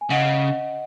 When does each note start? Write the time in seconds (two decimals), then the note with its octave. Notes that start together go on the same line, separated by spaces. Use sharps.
0.01 G#5
0.11 C#3 D#5 F#5